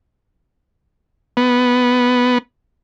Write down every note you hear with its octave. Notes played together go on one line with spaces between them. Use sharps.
B3